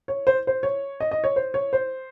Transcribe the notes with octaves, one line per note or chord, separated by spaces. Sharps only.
C#5
C5
C5
C#5
D#5
D#5
C#5
C5
C#5
C5